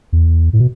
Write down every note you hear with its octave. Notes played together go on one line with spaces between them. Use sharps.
E2
A2
B2